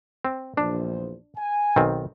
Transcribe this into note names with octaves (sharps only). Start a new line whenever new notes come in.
C4
A#1 E2 D4 C5
G#5
B1 D#3 C4